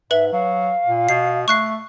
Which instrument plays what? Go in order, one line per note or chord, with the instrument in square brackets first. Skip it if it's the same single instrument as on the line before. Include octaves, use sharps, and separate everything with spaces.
[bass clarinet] G#2 [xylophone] B4 F#7 [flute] E5
[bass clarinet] F#3 [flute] F5
[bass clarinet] A#2
[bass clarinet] B2 [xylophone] C7
[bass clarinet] A3 [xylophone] C#6 F#6 C7